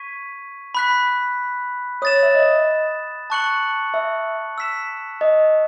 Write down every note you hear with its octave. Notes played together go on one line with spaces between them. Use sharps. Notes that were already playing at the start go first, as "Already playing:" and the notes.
Already playing: C#6 G#6 B6 D#7
B5 F#6 B6
C#5 D#6 A6 E7
E5
D#5
A5 C#6 F#6 C#7 F#7
E5
E6 B6 E7
D#5